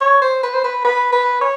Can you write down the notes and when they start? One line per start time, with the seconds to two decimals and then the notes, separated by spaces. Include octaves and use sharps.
0.01 C#5
0.21 C5
0.43 B4
0.54 C5
0.64 B4
0.84 B4
1.12 B4
1.41 C#5